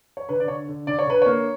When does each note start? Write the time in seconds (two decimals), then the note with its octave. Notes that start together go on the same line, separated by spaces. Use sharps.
0.17 C#5
0.29 D3 B4
0.40 D5
0.48 D3 C#5
0.68 D3
0.87 D3 D5
0.99 C#5
1.07 D3 B4
1.22 A#3 C#5